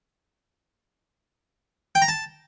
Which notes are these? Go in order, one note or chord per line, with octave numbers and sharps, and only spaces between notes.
G5
A#5
A5